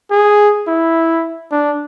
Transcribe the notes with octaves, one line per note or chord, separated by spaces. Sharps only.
G#4
E4
D4